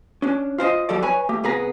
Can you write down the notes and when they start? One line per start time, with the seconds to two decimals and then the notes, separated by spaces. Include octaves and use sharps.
0.22 C#4 D4
0.58 F4 C5 D5 D#5
0.89 F#3 G3 A4 D5
1.02 B4 C#5 G#5 B5
1.29 A3 G4
1.43 C2 B3 G#4 B4 A#5